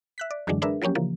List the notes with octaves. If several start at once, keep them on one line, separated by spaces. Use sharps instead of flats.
E5 F#6 B6
D5
F#2 D3 E3 F#3 G#3 D4
G#3 D4 G#4 A#4 B4 E5
F3 F#3 A#3 C#4 G4
C#3 E3 F3 A#3